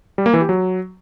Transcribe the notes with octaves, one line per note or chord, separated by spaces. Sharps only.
G3
A#3
E3
G4
F#3